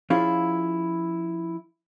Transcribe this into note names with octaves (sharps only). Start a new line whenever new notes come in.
F3 C#4 E4 F4 G#4